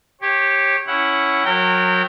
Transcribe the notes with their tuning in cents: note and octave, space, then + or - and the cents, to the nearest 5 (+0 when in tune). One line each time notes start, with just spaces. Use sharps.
G4 +0 C#5 -25
C#4 +0 E4 +0 F#5 +0
F#3 -25 A#4 -30 G5 -15